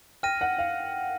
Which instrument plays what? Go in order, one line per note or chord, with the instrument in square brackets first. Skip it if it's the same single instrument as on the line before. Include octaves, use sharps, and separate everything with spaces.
[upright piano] G5 [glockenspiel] F6 A#6 D#7
[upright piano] F#5
F5